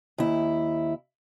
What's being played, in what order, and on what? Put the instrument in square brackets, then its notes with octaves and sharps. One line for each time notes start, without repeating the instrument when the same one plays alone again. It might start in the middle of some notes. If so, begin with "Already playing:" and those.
[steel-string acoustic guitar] D#2 E4